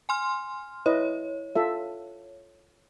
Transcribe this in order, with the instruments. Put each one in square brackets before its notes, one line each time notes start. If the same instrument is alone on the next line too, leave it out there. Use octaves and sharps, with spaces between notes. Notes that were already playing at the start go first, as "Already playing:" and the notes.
[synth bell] G#5 C6 F6
[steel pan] E4 B4 D#5 [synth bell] C#5
[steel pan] F4 A4 E5